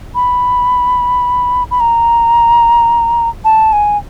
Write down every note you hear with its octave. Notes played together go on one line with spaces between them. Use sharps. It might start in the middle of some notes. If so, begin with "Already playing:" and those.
B5
B5
A#5
A5
G#5